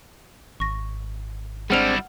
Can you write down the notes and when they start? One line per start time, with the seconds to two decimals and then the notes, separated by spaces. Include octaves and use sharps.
0.60 G#1 C#6 A#6
1.70 G3 G#3 C4 D4 E4 F#5 F6 F7